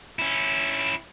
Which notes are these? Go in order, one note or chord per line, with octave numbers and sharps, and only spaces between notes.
C#4 E4